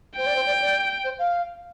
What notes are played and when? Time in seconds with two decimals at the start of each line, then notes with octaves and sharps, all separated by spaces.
0.17 C5 G5
0.26 D5
0.36 C5
0.46 D5
0.61 D5
1.04 C5
1.19 F5